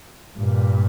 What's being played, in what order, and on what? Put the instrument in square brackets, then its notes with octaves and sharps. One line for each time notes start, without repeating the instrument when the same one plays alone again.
[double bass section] G2 A#2